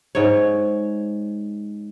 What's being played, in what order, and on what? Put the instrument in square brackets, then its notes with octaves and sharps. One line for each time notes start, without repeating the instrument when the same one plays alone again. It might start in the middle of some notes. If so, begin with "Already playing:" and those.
[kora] G#2 C#5